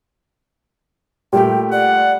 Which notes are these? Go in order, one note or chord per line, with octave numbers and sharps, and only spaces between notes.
A#2 G3 A3 G4 G5
D5 F#5